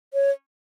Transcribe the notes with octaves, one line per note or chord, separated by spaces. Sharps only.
C#5